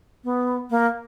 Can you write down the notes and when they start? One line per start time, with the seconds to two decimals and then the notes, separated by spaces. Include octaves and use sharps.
0.24 B3
0.70 A#3